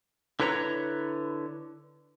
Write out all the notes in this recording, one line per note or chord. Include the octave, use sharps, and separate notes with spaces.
D3 E4 B4 C#5 G5 A#5